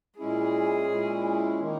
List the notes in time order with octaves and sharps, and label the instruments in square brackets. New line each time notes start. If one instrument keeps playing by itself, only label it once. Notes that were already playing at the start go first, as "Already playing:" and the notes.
[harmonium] A#2 G#3 C#4 E4 [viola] G#4
[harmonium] A#2 G#3 C#4 E4
D#3 A#3 D#4